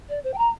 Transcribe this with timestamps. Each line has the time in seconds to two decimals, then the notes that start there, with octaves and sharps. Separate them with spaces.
0.09 D5
0.24 C5
0.33 G5
0.38 A#5